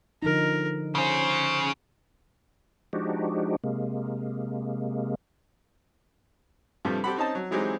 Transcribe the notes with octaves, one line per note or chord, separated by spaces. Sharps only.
D3 F3 D#4 A#4
C#3 C#4 C5
F3 G#3 D4 D#4 F#4 G4
C3 G#3 A#3
G2 C3 F3 G3 A3
C4 G4 A4 C5 F#5 B5
C4 C#4 D#4 D#5 A5
F#3
E3 F#3 G#3 C4 D#4 G4